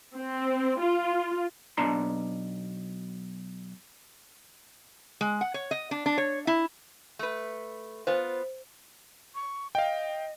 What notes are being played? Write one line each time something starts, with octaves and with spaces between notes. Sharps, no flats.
C4
F4
B1 B2 D4 A5 A#5 C6
G#3
F#5
C#5
D#5
D4
D4
C#5
E4
A3 B4
B3 F4 C5
C#6
D#5 F5 G5